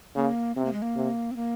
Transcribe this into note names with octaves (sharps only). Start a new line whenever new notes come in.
C#3 A#3
C3 C4
A#3
G#3
A#3
C3
C4
A#3